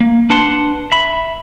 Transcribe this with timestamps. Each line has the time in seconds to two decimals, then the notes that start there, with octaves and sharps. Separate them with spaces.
0.01 A#3
0.30 D4 B4 F#5 A5 C6
0.92 E5 B5